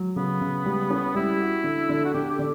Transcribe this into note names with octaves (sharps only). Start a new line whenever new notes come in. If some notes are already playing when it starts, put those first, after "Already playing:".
Already playing: F#3
C#3 B3
C#3
G3
C#4
G3 E4
F#4
D3
D3
F#4
D3 G4
G4
D3